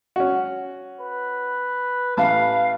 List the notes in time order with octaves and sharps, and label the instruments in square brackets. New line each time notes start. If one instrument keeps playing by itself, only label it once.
[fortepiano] C#4 F#4
[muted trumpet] B4
[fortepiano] A1 A5 [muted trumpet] B4 [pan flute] F5